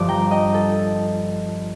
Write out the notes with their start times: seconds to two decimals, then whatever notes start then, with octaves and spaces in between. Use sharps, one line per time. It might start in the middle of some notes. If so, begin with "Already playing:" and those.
Already playing: G1 G2 F3 D6
0.08 G5 A#5
0.31 D#5 G5
0.54 A4